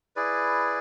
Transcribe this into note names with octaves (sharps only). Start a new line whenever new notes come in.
E4 G#4 B4 D5